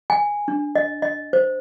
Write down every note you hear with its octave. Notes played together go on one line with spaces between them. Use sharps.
G#5
D4
D#5
D#5
C5